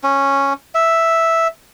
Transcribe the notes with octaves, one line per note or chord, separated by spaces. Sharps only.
C#4
E5